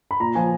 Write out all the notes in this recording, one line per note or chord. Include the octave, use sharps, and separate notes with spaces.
B5
A#2 A#5
F3 G#5